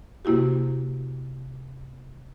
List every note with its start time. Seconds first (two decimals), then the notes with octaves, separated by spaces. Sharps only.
0.25 C3 A#3 E4 F#4 G4